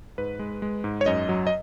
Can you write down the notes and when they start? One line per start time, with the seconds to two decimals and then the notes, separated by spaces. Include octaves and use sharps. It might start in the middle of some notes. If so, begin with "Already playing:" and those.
0.18 G#2 B4
0.39 G#3
0.62 G#3
0.84 G#2
1.01 C#5
1.06 F#2 D#5
1.29 F#3
1.47 D#5